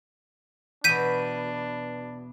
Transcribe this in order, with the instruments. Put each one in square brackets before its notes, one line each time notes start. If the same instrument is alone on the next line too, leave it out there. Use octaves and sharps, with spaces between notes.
[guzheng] E2 B2 [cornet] D4 [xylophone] G6 B6 D#7